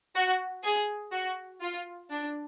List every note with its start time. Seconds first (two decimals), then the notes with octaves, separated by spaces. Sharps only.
0.14 F#4
0.63 G#4
1.11 F#4
1.60 F4
2.09 D4